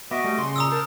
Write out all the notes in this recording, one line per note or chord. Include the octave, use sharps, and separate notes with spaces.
B3 F#4 D#5 E5 D6
G3 A3
C#3 C6
A#2 A#5 D#6 E6
A#4 C5 A5